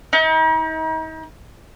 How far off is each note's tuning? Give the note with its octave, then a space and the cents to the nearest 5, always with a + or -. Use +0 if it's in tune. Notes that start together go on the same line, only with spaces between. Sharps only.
D#4 +40